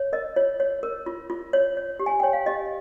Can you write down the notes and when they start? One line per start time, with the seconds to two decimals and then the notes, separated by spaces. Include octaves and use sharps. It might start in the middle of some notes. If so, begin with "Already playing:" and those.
Already playing: C#5
0.13 A#4 D#5
0.36 F4 C#5
0.60 C#5
0.83 A#4
1.06 F4
1.30 F4
1.53 C#5
1.77 C#5
1.99 G4
2.06 G#5
2.20 C#5 G5
2.33 F5
2.46 G4 D#5